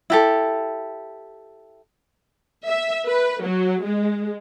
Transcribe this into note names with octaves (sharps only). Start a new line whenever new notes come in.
E4 G4 A4
E5
B4
F#3
G#3